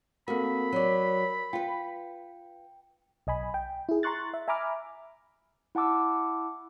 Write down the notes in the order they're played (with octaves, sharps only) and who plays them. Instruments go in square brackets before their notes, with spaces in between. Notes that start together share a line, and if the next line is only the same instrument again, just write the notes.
[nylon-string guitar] A#3 F#4 [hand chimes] C4 A4 A#4 [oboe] B5
[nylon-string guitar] F#3 D5 [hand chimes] A#4
[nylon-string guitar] F4 B4 [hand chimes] G5
[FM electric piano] B1 D#5 G#5 B5
G5
E4 G#4
A#5 C6 C#6 F#6 A6
E5
E5 G#5 A#5 B5 D6 F6
[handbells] E4 F#5 A5 D6 E6